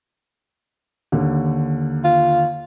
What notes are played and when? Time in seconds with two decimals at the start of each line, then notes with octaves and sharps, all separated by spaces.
1.12 D#2 D3
2.04 F4